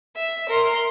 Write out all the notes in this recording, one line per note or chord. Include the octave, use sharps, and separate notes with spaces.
E5
A#4 C6